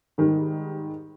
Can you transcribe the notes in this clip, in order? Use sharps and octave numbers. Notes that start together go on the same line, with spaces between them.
G#2 D#3 G3